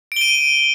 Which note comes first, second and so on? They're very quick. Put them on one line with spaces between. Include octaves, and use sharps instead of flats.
D7 G7 D#7